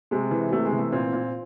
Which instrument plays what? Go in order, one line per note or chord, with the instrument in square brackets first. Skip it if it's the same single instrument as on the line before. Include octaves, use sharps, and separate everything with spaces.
[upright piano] C3 G#3
E3
C3 A3
G#3
E3
A3
A#2 C4
A#2